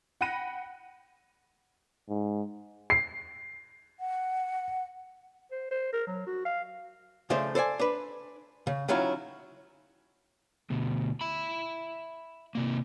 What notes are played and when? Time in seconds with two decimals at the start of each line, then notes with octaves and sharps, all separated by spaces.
0.21 F#5 G5 B5 F#6 A#6 D#7
2.09 G#2
2.90 C7
4.00 F#5
5.51 C5
5.71 C5
5.93 A#4
6.07 F#3
6.27 F#4
6.45 F5
7.30 C#3 F3 A3 D4 C5
7.55 A4 C5 D5 G#5
7.79 D4 B4
8.67 C#3
8.88 D#3 F#3 C#4 E4 F4
10.70 D2 B2
11.21 E5 B5
12.55 C3 A#3